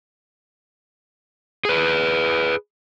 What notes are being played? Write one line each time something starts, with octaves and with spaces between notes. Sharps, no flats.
G#4 B4